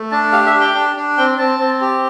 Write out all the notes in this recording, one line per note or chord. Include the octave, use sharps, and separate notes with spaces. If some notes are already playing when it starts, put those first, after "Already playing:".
Already playing: A3
D4 A5
G4 F5
E5
G4
G5
D4
D4
C4 G5
C4 A5
C4
G4